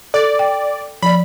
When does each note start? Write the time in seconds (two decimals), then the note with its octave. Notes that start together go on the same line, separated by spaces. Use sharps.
0.14 A4 D5
0.39 G5
1.02 F3 D5 B5